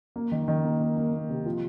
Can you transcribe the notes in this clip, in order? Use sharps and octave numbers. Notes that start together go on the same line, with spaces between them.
A#3
D#3
D#3
A#3
A#3
A#3
A#3
C3
F3